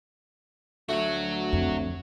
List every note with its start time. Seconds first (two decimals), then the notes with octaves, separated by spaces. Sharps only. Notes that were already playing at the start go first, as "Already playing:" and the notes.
0.89 D2 A3 F#4 C#5
1.53 F2